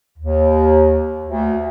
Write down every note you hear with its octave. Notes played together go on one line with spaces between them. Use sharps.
D#2
D2